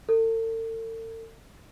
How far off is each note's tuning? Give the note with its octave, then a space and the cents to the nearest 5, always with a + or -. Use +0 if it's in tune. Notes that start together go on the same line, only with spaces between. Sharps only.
A4 +40